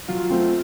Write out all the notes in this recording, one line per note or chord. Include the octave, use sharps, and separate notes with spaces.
F#3 F4
A3 C4